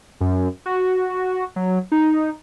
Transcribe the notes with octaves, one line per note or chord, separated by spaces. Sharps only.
F#2
F#4
F#3
D#4